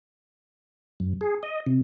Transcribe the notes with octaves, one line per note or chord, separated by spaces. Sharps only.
F#2
G#4
D#5
C3